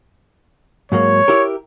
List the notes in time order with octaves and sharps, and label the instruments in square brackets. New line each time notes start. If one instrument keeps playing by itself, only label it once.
[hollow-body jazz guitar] G#2 F#3 A#3 [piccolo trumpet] C#5
[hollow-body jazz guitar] E4 G4 A#4